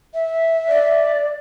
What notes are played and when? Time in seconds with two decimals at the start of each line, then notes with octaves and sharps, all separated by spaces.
0.14 E5
0.68 D5